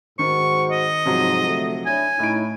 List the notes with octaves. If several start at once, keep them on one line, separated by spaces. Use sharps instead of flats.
G#2 D#3 F#4 C5 C#6
D#5
G#2 C3 F3 F#3
D3 A3
D4 E4 C#5 G#5
A2 C#4 D#4 E4 D7